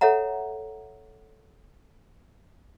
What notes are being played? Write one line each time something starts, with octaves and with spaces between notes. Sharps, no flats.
A4 C#5 E5 F#5 A#5